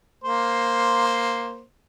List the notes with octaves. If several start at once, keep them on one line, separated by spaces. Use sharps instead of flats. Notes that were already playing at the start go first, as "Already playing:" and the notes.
A#3 C5